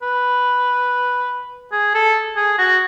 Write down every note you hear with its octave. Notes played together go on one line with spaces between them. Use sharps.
B4
G#4
A4
G#4
F#4